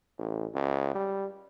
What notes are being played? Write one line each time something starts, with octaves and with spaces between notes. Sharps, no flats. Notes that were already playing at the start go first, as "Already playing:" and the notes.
A1
C#2
G3